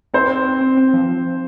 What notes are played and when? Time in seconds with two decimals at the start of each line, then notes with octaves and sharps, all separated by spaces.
0.14 C4 C5
0.30 C4
0.45 C4
0.61 C4
0.77 C4
0.94 F3